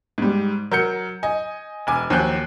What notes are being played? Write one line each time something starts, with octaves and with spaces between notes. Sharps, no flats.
G#2 G3
F#3 A#4 G6 C#7
D#5 G#5
E1 G#5 D6
D#2 F3 F#3 G#5 F#6 G6